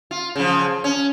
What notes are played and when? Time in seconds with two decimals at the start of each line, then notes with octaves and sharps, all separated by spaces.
0.11 F4
0.36 C#3 F3
0.84 C#4